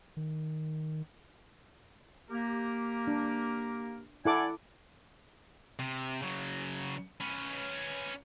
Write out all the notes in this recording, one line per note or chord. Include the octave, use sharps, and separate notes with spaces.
D#3
A#3 G4 A#4
D4
E4 A4 D5 F#5 G#5 D6
C3
C#3 F#3
C#4 B4